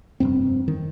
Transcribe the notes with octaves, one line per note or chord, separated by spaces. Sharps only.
F1 G2 C4
D#3